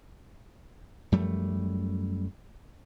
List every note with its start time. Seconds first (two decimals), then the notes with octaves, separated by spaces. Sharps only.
1.12 F#2 F3 G3 A3